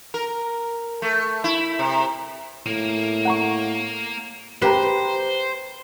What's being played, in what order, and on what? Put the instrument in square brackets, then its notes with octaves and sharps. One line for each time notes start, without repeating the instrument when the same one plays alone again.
[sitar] A#4
A3
E4
C3
[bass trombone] A2 [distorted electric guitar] A#3 A#4
[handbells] F#5 A#5 C#6
[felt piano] G4 G5 A#5 [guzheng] B4 [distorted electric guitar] C5